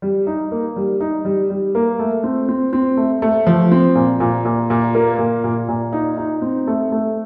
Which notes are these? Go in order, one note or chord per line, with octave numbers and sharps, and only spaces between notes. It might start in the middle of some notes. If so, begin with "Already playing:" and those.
G3
D#4
A#3
G3
D#4
G3
G3
A#3
A3
C4
C4
C4
A3
A3
F3
C4
A#2
A#2
A#2
A#2
A#3
A#2
A#2
A#2
D#4
D#4
C4
A3
A3